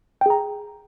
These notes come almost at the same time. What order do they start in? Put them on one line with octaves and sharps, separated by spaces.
G5 G#4 A#5